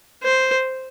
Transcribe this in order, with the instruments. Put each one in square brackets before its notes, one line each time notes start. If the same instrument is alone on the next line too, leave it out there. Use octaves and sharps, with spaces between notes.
[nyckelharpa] C5